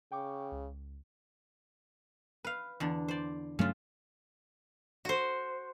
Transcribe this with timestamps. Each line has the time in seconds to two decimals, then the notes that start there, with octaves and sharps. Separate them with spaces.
0.12 C#3 G5 C#6 D6
0.52 C#2
2.45 B4 F5
2.80 E2 D3 D4
3.08 C5 D5
3.59 G2 C#3 F#3 A3 F4
5.05 F#4 C5